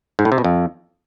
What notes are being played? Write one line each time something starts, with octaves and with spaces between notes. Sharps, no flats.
G#2
A2
C3
B2
F2